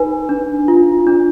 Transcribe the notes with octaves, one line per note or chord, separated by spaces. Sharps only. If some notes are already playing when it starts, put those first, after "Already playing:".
Already playing: D#4 B4 G#5
D4
F4
D4